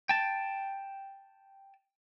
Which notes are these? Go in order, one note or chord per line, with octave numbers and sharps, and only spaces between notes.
G5 A5